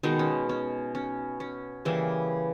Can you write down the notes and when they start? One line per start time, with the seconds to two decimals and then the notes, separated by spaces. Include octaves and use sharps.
0.03 B2 D#3 G#3 B3 D#4
0.19 C#4
0.49 C#4
0.95 C#4
1.40 C#4
1.85 C#3 E3 G3 A#3 E4